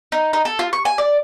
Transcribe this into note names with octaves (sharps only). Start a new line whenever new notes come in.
D#4
D#4
A4
F4
C#6
G#5
D5